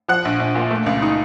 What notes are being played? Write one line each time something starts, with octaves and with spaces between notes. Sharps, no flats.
F3 F#5 F#6
A#1
A#1
A#2
A3
C#2
D#4